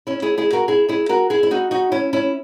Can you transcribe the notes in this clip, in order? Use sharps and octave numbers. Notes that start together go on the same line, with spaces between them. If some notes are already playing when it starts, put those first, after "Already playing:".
C#4 E4
E4 G#4
E4 G#4
F#4 A#4
E4 G#4
E4 G#4
F#4 A#4
E4 G#4
E4
D#4 F#4
D#4 F#4
C#4 E4
C#4 E4